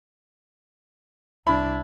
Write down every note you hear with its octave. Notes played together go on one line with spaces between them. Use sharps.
C2 D4 E4 B5